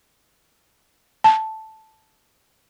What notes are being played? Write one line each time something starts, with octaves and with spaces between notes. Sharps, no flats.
A5